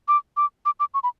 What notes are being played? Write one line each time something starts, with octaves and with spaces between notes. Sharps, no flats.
D6
D6
D6
D6
C#6
B5